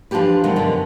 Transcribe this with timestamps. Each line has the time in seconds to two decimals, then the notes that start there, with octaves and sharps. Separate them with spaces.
0.11 E3 F3 D4 F4 G4 B4
0.44 C3 D#3 F3 F#3 G#3
0.56 F#2 B2 D3 F3